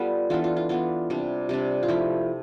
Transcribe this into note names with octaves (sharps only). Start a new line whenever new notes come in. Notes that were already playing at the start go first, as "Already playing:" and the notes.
Already playing: G3 B3 F4 G4 A4 B4 D5
E3 B3 D4 F4 A4
F4
F4
E3 B3 D4 F4
C3 G3 D4
C3 G3 D4
F4
F3 A3 E4 G4